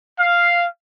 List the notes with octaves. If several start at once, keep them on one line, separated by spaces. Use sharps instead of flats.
F5